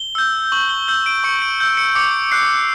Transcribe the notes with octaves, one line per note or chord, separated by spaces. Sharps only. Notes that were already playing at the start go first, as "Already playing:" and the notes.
Already playing: G7
E6 G6
C#6 F#7
G7
E6 G6 F#7
D7
C#6 C#7
D7
E6 G6
C#7
D6 C#7
F#6 C7